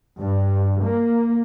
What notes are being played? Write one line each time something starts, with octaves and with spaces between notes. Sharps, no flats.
G2
A#3